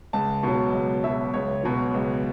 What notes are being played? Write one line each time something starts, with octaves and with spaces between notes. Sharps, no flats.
C#2 A5
B2 F#3
C#2
B2 F#3 E5
C#2 C#5
B2 F#3
C#2